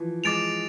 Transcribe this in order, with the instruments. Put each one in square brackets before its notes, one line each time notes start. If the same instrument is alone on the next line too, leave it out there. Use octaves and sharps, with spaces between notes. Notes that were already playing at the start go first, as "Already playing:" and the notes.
Already playing: [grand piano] E3 F3
[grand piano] G#3 [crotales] D6 A6 D7 F7